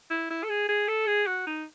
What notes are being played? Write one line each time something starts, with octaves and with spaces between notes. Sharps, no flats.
E4
E4
A4
G#4
G#4
A4
G#4
F#4
D#4